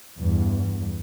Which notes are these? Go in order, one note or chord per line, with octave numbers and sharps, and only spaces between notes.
E2 G2